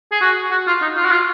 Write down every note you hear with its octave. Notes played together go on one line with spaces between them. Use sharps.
G#4
F#4
F#4
F4
D#4
F4
F#4
F4